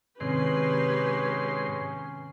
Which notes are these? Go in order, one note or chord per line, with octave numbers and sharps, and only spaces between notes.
G#2 C3 D#3 C4 C#4 G4 B4 C6